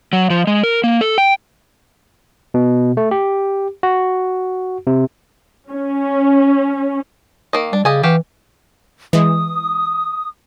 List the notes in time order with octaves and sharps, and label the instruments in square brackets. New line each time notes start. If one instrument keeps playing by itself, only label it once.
[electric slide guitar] F#3
F3
G#3
A#4
A#3
A4
G5
[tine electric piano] B2
A3
G4
F#4
C3
[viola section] C#4
[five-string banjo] D#3 A#3 D#5
[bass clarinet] G3 [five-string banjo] D4
[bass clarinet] C#3 [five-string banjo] G3 D#5 G#5
[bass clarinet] E3 [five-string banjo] F#4 G4 F5
[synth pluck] E3 G#3 [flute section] D#6